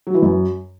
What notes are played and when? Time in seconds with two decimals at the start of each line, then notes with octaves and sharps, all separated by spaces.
0.07 F#3
0.15 E3
0.22 F#2